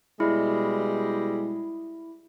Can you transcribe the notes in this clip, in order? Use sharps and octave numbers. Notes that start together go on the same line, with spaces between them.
B2 G3 G#3 E4